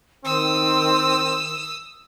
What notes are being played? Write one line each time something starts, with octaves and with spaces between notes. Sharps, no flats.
D#3 C4 D#6 E6